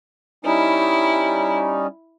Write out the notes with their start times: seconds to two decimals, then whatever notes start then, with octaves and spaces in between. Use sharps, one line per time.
0.45 G3 C#4 D#4 E4